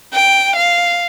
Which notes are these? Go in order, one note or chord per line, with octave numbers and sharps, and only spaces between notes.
G5
F5